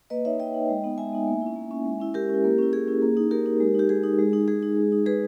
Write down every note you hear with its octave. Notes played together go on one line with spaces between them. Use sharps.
A#3 B4 D#5
D#4 C#5 E5
A#3 D#5 G5
D#4
G#3
B3 D#4
G#3 E5 G#5
B3 D#4
A#3
C#4 E4
A#3
C#4 E4
G#3
C#4 E4
G#3 G4 A#4
C#4 E4
A#3
C#4 E4
A#3 G#4
C#4 E4
A#3
D#4
A#3 G4 A#4
D#4
G#3
D#4 G4
G#3 G#4
D#4
G#3
D#4
G#3 G#4
D#4
G#3
D#4
G#3 G#4 B4